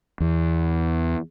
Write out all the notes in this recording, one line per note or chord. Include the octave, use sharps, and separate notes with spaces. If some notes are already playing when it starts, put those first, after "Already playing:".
E2